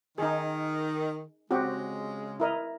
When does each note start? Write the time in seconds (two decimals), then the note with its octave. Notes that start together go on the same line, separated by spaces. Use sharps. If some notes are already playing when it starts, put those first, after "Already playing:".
0.18 D#3 D#4 G#4
1.51 C#3 G#3 C4 F#4 G4
2.40 E4 A#4 D#5